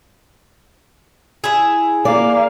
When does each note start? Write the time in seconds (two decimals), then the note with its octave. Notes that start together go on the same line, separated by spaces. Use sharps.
1.44 E4 G#4
2.05 A#3 D5 F5